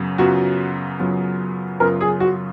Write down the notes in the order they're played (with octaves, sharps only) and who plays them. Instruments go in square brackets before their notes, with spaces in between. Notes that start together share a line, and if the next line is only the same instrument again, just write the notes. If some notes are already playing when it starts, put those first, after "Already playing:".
Already playing: [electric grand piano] F#2 C#3 F#3 B3
[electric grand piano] F#2 C#3 F#3 B3 F4 [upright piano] F#4
[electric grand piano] F#2 C#3 F#3 B3 F4
[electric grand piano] F#2 C#3 F#3 B3 F4 [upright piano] A#4
[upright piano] G#4
F#4